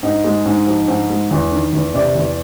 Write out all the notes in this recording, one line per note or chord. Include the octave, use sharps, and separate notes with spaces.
G#2 D#5
G#3
G#2
F3
G#2
G#3
E2
D#3
E2
C3 D5
E2